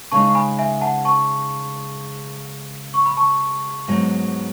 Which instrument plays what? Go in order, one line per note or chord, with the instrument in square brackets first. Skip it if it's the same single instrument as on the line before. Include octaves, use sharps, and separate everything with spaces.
[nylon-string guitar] C#3 G#3 D#4 [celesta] A5 C#6
[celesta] C#6
G#5 B5
E5 G#5
F#5 A5
A5 C#6
C#6
B5
A5 C#6
[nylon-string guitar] G#2 F#3 B3